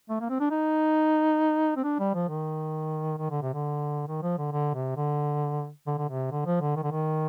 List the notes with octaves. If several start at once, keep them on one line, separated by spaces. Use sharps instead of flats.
A3
A#3
C4
D4
D#4
C4
D4
G3
F3
D#3
D#3
D3
C3
D3
D#3
F3
D3
D3
C3
D3
D3
D3
C3
D3
F3
D3
D#3
D3
D#3